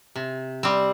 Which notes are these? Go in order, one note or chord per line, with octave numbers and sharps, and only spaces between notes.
C3
G3 C4